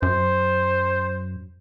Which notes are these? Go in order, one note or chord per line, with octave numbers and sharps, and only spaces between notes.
F#2 C5